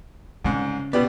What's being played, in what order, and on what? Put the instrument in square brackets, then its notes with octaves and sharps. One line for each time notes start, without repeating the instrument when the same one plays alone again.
[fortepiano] C2 G#2 [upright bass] C#3
[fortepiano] B2 G4 D5 [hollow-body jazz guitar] B3